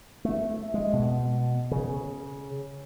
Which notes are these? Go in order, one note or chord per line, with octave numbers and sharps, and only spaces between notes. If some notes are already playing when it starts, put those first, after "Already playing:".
A3
G#3
B2
C#3